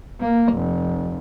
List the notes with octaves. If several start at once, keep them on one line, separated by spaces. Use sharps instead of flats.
A#3
F1